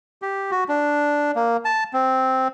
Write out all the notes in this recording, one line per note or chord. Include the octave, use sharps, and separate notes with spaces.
G4
F#4
D4
A#3
A5
C4